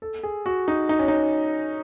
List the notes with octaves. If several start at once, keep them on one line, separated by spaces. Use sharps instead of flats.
A4
G#4
F#4
D#4
D#4
C#4
D#4